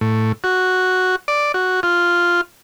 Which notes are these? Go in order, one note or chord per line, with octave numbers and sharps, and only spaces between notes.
A2
F#4
D5
F#4
F4